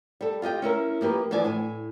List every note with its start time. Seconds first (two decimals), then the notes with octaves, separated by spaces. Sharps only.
0.21 G3 A4
0.42 F4 G4 D#5 G5
0.62 C#4 E4 A#4
1.01 F3 A#3 G4 B4
1.31 E3 F3 D4 D5 G#5
1.44 A2 G#5